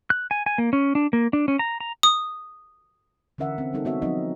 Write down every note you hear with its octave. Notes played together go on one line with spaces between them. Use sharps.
F#6
G#5
G#5
A#3
C#4
D4
A#3
D4
C#4
A#5
A#5
D#6
D3 E3 C#4 A#4 E5 F#5
C4
E3 G3 B3 D#4 A4 A#4
B3 C4 F#4 C#5 E5
F3 F#3 C4 D#4 D#5